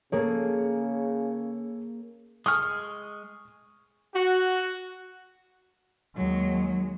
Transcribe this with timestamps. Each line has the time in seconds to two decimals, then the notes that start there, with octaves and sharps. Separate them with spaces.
0.12 C#3 A#3 G#4 A4 C#5
2.46 G#3 G#5 C#6 D#6 F6
4.14 F#4
6.17 D#2 D#3 F#3 G#3